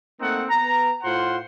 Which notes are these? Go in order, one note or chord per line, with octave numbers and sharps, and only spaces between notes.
A3 A#3 C4 D#4 F#5
B3 A#5
A2 F4 C5 F#5 C6